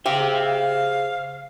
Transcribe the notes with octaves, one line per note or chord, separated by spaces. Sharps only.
C#3 G4 C5 E5 F5